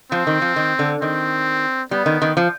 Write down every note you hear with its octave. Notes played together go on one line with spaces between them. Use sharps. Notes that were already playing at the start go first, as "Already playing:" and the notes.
F3 C4
D#3
F3
D#3
D3
D#3 C4
G3 B3
D#3
D#3
F3